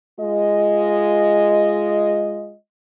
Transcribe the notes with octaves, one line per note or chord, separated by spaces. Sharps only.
G#3 F4 D#5